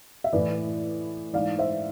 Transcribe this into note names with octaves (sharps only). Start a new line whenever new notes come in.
E5
A2 E3 B4 D5
G#2 E3 D5 F5
C5 E5